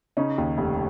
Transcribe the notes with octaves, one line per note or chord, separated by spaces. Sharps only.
C#3 C#4 D#4
D#2
F1